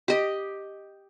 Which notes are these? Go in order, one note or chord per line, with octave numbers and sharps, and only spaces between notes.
G4 D#5